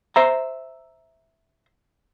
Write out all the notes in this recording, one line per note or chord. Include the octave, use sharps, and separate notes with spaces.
C5 E5 A#5